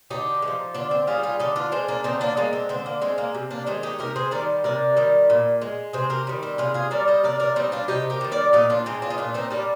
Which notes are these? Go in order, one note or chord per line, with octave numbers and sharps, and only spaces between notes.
D3 D#4 G4
G#3
F3
D3 D4 F4
C4
G3 F4 G#4
F4 G#4
D3 D#4 G4
D4 F4
G#3 C4
A#3 D4
D3 C4 D#4
A#3 D4
G#3 A#3 D4
C4
D3 C4
A#3
G#3 C4
A#3
C3
A#3 D4
D#3 G#3 C4
D#4 G4
C3 G4 A#4
G#4 C5
D#3 G3 A#4 D5
C3 A#4 D5
D#3 G3
A#2
G#3
C3 G#4 C5
G4 A#4
D#3 G3
C4
C3 F4 G#4
F4 G#4
G3 A#4 D5
C5 D#5
C3 A#4 D5
A#4 D5
G3 C4 D#4
D4 F4
C3 D#4 G4
G4 A#4
D#3 G3
A#4 D5
A#2 D#4 G4
D4 F4
G#3 C4 D#4
D4 F4
D#4
A#2 D4 F4
C4 D#4
G3 A#3 D4